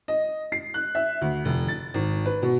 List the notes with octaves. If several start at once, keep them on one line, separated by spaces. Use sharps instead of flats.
D#5
C7
F#6
E5
D2
F1
A6
G#1
B4
B2